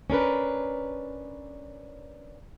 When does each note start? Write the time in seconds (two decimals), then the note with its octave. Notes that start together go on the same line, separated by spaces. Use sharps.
0.10 C#4 D4 A#4 B4